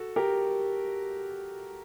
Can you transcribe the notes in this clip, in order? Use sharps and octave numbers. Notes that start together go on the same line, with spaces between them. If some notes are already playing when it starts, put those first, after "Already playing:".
Already playing: F#4 A4
G4 A#4